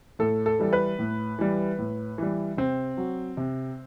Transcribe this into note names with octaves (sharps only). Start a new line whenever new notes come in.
A2 A4
A4
E3 G3
B4
A2
E3 G3
A2
E3 G3
C3 C4
F#3
C3